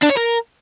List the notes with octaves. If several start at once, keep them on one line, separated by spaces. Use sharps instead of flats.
D4
C#5
A#4